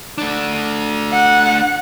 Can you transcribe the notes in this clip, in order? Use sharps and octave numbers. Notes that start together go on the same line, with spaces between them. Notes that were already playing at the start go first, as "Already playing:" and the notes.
A3 D4
F#5